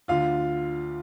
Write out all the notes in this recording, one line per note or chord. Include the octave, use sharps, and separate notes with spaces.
D2 D3 F4 F5